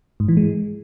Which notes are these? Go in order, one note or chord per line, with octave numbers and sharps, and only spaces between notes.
G#2
E3
G#3